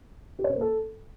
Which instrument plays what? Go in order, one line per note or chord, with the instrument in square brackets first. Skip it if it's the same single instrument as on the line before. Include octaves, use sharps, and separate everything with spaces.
[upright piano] G4
C#5
C5
A#3
A4